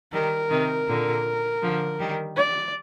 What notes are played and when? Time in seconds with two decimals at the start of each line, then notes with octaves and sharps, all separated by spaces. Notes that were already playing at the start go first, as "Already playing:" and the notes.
0.12 D#3 G3 A#4
0.50 C3 D#3
0.88 A#2 D3
1.63 D3 F3
2.00 D#3 G3
2.36 D5